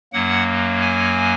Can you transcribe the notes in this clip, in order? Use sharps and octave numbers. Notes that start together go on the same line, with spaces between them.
F#2 F#3 A#3 F#5
G#5